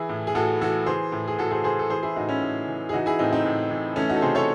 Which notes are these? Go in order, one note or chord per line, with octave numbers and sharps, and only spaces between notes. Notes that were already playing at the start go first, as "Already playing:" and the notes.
Already playing: E3 E4 G#4
A2
G#4
A2 F#4 A4
E3 F#4 A4
E3 G#4 C5
A2
G#4
A2 F#4 A4
G#4 C5
E3 G#4 C5
A4
E3 G#4 C5
E4 G#4
A2 D#4 F#4
C#4 E4
A2
E3
G#4
E3 D#4 F#4
E4 G#4
A2 C4 D#4
C4 D#4
A2
E3
E3 A3 C#4
D#4 F#4
A4
C3 G#4 C5
A4 C#5